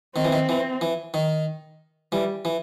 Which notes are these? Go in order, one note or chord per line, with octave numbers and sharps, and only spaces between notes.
D#3 C4
E3
D#3
E3
E3
D#3
E3 G3
E3